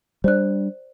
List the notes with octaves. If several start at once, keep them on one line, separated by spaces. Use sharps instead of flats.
G3 D4 C5 D5 F#6